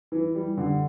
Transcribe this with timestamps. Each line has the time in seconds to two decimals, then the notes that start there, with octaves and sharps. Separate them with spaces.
0.12 E3
0.35 G3
0.58 D3